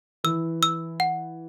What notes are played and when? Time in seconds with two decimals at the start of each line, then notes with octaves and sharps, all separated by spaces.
0.24 E3 E6
0.63 E6
1.00 F#5